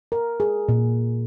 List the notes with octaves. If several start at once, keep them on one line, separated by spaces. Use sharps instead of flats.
A#4
G#4
A#2